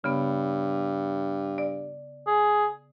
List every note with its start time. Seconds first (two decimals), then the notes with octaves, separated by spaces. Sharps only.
0.04 G2 C#3 B3
1.58 D5
2.27 G#4